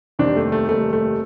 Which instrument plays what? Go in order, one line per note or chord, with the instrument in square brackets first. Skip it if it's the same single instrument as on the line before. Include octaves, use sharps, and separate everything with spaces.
[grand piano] F1 D#2 D#3 G3 C4 [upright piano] D4
[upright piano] A3
A3
[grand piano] F1 D#2 D#3 G3 C4 [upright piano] A3
[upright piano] A3